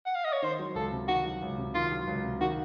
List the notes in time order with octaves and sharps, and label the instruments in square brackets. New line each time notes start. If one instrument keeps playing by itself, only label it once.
[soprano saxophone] F#5
F5
D#5
C#5
[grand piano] D#3 [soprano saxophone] C5
[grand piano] F#3
[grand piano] C#2 [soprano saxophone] A4
[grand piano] C3
[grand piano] D#3 [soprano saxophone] F#4
[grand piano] F#3
C#2
C3
[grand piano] D#3 [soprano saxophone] F4
[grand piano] F#3
C#2
C3
[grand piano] D#3 [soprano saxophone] F#4